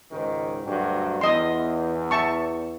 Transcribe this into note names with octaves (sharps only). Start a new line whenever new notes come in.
C#2 G#2 D#3
D2 G2 F#3
E2 D#5 C6
E5 A5 C#6